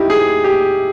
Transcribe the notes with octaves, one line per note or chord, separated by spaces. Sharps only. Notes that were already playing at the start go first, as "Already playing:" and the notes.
Already playing: D#4 E4 G4
G#4
G4